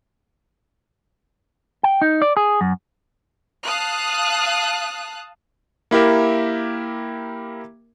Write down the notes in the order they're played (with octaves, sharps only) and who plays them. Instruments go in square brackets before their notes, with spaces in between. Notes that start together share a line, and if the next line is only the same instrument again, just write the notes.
[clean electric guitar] G5
D#4
D5
G#4
F#2
[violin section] F5 A5 D#6 F#6
[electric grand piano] A#3 E4 G4 A#4 E5